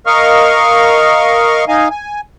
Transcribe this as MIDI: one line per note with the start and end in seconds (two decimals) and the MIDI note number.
0.06 1.65 70
0.06 1.65 75
0.06 1.65 77
0.06 1.65 85
0.06 1.65 89
1.68 1.89 63
1.68 1.89 75
1.68 1.89 77
1.68 1.89 80
1.90 2.21 80